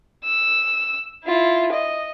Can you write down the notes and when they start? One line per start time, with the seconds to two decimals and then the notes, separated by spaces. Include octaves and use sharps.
0.24 E6
1.25 E4 F4
1.72 D#5